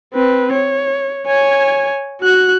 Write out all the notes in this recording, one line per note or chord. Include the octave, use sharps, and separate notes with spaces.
C4 B4
C#5
C#5 G#5
F#4 F#6